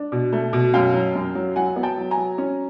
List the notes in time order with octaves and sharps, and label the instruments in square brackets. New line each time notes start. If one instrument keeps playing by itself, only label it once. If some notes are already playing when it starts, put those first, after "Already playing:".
Already playing: [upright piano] D4
B2
A3
B2
F#2 F5 G5
F#3
F#2
F#3
F#3 F#5 G#5
B3
G5 A5
F#3
G#5 A#5
F#3
C#4